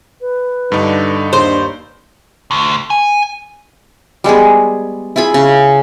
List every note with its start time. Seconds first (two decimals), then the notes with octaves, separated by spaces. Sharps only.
0.21 B4
0.72 G2 D3 D#4
1.33 D#2 D4 C5
2.51 D2
2.90 G#5
4.24 G3 G#3 B3 G#4
5.16 E4 F4 G#4 B5
5.34 C#3